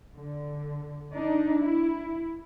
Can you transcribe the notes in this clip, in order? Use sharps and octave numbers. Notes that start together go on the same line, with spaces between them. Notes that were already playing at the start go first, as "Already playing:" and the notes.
D3
D4 D#4
E4